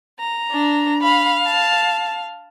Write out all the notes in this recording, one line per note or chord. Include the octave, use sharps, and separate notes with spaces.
A#5
D4
F5 B5
A5